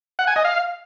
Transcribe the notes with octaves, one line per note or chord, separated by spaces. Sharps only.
F#5
G#5
D#5
F5